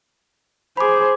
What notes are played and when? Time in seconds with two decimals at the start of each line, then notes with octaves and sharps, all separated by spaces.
0.77 G#4 C5 B5 D6